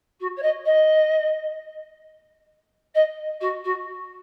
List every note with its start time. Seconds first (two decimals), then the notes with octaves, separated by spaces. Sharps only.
0.20 F#4
0.36 C#5
0.42 D#5
0.65 D#5
2.95 D#5
3.41 F#4
3.64 F#4